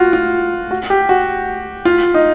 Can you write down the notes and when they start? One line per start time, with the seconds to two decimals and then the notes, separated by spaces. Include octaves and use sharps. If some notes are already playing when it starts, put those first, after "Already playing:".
Already playing: F4 F#4
0.13 F4
0.71 F#4
0.90 G4
1.09 F#4
1.85 F4
2.14 D#4